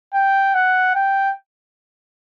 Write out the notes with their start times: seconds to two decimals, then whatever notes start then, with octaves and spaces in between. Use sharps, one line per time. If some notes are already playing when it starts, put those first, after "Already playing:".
0.14 G5
0.54 F#5
0.95 G5